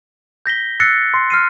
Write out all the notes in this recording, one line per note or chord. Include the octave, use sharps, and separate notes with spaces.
G6 A#6 B6 G7
E6 F#6 A6 A#6 C7 C#7
C6 C7
F6 C7 D#7